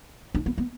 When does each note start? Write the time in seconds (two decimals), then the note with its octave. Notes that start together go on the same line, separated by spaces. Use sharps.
0.35 D4
0.46 B3
0.58 B3